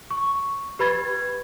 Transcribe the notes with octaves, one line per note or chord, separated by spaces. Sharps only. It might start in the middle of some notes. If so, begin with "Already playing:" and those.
C#6
G4 B4 B5 G#6 A6